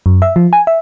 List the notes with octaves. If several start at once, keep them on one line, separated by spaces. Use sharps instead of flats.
F#2
E5
F3
G#5
E5